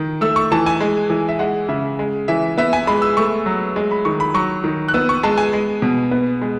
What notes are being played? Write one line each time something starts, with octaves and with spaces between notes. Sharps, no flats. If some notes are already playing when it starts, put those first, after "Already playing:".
Already playing: D#3
A3 E6
C#6
E3 A5
G#5
G#3
E3
E5
G#3 F#5
C#3 E5
G#3
E3 E5
B3 E5
G#5
G#3 B5
E6
A3 C#6
F#3
G#3
B5
D#3 C#6
B5
F#3 C#6
D#3
F#6
B3 E6
C#6
G#3 A5
G#5
G#3
B2
B3
G#3